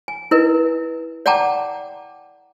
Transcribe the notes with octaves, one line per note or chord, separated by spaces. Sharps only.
G#5
E4 A#4 B4 D#5
D5 F#5 G5 A5 A#5 D6